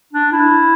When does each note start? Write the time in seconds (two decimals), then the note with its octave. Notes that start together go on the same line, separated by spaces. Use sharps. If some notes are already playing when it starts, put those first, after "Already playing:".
0.13 D4
0.33 E4